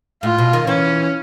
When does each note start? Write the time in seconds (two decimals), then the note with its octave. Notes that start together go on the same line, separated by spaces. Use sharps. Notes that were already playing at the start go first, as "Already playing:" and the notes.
0.23 A2 F4
0.38 B2
0.53 D#3
0.67 E3 C#4